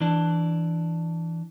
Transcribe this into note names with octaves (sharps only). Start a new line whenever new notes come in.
E3 D4